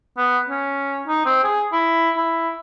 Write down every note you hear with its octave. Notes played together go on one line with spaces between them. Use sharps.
B3
C#4
D#4
C4
G#4
E4
E4